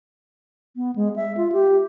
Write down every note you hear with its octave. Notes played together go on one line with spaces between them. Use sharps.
B3
G#3
E5
F4
G4